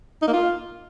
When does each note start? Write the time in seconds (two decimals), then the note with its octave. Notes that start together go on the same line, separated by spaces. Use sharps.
0.22 D#4
0.28 A#3
0.33 F4